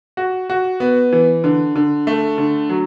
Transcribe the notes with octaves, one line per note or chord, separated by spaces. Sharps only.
F#4
F#4
B3
E3
D3
D3
A3
D3
F#3